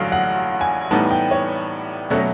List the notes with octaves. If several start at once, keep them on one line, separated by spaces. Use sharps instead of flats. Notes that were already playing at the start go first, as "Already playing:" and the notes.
Already playing: A1 G2 D3 F#3 F5
F#5
G#5
A2 E3 G3 B3 D#4 A5
G5
C#5
B2 F#3 A3 C#4